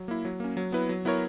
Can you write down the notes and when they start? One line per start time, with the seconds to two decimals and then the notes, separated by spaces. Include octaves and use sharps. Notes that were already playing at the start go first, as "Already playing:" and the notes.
Already playing: F#3
0.08 A#3 E4
0.25 F#3
0.40 A#3 C#4
0.57 F#3
0.72 B3 E4 B4
0.89 F#3
1.05 B3 E4 A#4 C#5